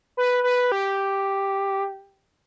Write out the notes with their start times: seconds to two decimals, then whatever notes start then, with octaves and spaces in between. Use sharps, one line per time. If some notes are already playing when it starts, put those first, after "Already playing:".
0.17 B4
0.43 B4
0.72 G4